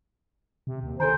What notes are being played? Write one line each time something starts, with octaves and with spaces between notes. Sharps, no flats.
C3
D#2
D#3 A4 C5 G#5 A#5